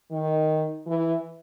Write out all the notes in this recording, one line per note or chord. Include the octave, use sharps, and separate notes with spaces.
D#3
E3